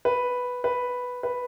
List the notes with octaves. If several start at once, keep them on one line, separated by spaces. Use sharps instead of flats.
B4
B4
B4